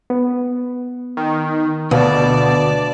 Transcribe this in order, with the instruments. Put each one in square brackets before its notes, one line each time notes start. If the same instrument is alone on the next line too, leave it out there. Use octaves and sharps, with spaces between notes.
[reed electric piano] B3
[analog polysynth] D#3
[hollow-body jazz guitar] D2 [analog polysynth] B2 [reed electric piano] B4 F5 [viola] D5 A5